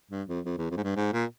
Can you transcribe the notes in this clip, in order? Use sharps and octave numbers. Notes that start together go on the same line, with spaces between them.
G2
F2
F2
E2
F2
G#2
G2
G#2
A#2